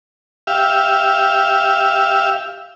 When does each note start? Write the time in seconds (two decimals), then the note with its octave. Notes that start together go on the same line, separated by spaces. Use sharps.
0.47 G4 E5 F5